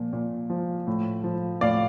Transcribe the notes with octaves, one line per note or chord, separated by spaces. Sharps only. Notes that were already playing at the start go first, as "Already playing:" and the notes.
Already playing: A#2 F3
A#2
F3
A2
F3
A2 D5 F5